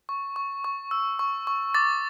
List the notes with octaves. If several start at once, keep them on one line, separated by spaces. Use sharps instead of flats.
C#6
C#6
C#6
E6
C#6
C#6
D6 A6